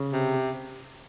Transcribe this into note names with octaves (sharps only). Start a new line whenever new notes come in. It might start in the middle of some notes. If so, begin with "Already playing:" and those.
Already playing: C#3
C3